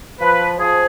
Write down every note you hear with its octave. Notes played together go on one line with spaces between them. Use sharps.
F3 B4
F3 G#4